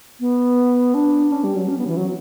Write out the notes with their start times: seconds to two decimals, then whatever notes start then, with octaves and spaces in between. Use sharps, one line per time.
0.20 B3
0.94 D4
1.32 C#4
1.44 G3
1.56 F#3
1.68 C#4
1.78 B3
1.87 E3
1.97 F#3